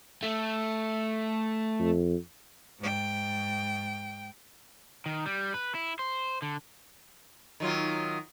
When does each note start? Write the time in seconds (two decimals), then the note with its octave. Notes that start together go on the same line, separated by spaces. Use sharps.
0.23 A3
1.80 F2
2.79 G#2 G5
5.06 D#3
5.26 G3
5.54 B4
5.75 E4
5.99 C5
6.42 D3
7.60 D#3 F#3 F4